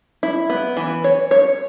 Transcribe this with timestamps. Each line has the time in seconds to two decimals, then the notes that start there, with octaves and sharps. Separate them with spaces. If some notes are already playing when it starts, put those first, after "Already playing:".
0.23 E4
0.50 B3
0.77 E3
1.04 C#5
1.31 C#5